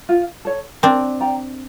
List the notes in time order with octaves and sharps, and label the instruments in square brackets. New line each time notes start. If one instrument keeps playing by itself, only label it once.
[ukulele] F4
A4 C#5
[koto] C4 D4 [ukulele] A#4
[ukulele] D5 G5 A#5